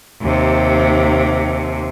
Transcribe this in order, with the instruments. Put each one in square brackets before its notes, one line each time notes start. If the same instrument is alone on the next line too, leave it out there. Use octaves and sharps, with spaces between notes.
[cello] D#2 C3